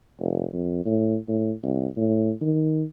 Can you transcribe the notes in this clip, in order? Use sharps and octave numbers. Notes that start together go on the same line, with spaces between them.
F1
F2
A2
A2
C2
A2
D#3